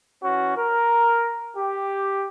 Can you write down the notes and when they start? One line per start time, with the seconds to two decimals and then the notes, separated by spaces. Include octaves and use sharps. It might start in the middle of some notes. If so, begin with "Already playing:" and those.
0.23 E3 C#4 F#4
0.57 A#4
1.57 G4